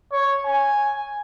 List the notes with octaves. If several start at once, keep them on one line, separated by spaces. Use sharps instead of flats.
C#5
G#5